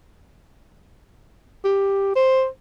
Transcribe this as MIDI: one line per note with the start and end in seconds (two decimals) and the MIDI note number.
1.64 2.11 67
2.16 2.46 72